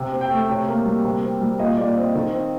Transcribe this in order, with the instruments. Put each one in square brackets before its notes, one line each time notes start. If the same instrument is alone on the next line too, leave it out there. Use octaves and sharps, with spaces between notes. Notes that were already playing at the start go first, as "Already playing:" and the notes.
Already playing: [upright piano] C3
C4
G5
A3
C3 C#5
A#3
G3
C3
C4
G3
A#2 D#5
A#2 D5
C4 D#5
D#3
C4